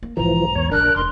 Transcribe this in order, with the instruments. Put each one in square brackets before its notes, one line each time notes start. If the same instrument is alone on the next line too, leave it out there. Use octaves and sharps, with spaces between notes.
[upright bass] A#3
[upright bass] B1 G#2 [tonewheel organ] E3 F3 [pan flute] A#5
[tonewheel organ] E2 C#5
[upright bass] A#1 G3 [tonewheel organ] D4 A#4 [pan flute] F#6
[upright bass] E1 [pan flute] C6